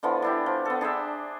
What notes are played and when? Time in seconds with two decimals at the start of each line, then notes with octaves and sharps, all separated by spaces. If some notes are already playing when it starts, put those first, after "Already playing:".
0.03 D3 E3 F3 B3
0.22 D4 E4 G4
0.46 F3
0.65 B3 A4
0.81 D4 G#4 C5 E5